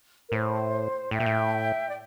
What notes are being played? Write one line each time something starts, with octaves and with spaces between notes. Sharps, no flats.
A#4
A2 C5
A2 E5 G5
A#2
A2
D5